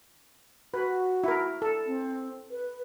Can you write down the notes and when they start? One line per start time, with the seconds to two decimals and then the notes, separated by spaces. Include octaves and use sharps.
0.74 F#4 B4
1.24 E4 A#4
1.62 A4
1.86 C4
2.50 B4